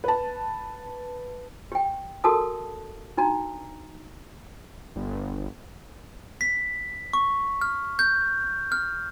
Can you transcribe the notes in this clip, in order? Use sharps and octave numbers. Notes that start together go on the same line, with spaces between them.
B4 A5
G4 G5
F#4 A4 A#4 A5 D#6
D4 D#4 F#4 A#5
G1
B6
C#6
F6
G6
F6